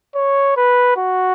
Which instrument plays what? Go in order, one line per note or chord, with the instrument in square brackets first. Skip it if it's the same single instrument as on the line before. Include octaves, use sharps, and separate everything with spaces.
[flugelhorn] C#5
B4
F#4